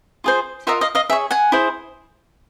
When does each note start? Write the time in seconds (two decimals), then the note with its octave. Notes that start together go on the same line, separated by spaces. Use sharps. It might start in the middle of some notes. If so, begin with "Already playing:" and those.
0.24 F4 G#4 C5
0.67 F4 A#4 D#5 E5 F#5
0.81 D#5 F5
0.95 D#5 F5
1.10 G#4 C#5 E5
1.31 F#5 G#5
1.52 E4 G#4 C5